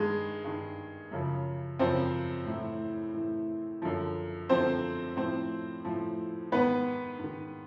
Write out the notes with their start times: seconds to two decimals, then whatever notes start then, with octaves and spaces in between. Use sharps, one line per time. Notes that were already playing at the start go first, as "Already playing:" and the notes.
Already playing: G2 D#3 G#3 G#4
0.44 G2 D#3
1.11 F#2 C#3 F3
1.79 F#2 C#3 F3 C4 C5
2.46 A2 E3
3.14 A2 E3
3.82 F#2 D3 F3
4.49 F#2 D3 F3 C4 C5
5.17 A2 F3 C4 C5
5.85 A2 F3
6.52 G#2 D#3 B3 B4
7.19 G#2 D#3